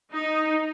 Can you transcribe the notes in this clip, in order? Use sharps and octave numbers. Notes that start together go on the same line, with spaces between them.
D#4